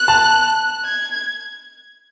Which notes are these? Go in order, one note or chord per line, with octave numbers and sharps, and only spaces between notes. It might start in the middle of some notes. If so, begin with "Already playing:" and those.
Already playing: F#6
A5
G#6